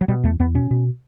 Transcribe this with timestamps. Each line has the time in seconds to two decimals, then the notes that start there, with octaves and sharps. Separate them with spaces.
0.01 F#3
0.08 B2 G3
0.24 E2 A3
0.40 E2 B3
0.55 B2 C#4
0.71 B2